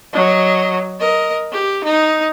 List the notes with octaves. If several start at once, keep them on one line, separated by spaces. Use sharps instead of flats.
F#3 D#5
A#4 D#5
G4
D#4